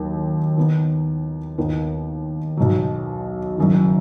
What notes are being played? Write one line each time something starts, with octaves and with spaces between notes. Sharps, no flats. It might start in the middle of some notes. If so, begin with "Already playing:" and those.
Already playing: D#2 D#3 F#3
D#3 B3 D#4
D#2 D#3 B3
B1 B2 F#3
F#1 F#2 D#3